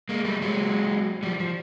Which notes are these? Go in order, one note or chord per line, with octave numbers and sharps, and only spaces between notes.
G#3 A#3
G3 A3
F#3 G#3
F3 G3
F3